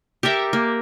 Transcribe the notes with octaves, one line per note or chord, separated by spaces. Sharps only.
G4 A4 A#4 E5
A#3